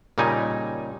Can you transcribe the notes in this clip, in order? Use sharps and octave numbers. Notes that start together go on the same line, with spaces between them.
A#2 C#3 G3 D#4 G#5